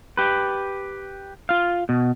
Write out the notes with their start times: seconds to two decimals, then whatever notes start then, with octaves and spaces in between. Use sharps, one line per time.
0.17 G4 B4
1.49 F4 F5
1.89 B2